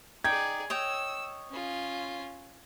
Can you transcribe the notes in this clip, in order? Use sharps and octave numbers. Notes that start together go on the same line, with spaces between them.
D#4 G#4 D5 G5 G#6
C#5 D#5 G5 E6
C#4 F4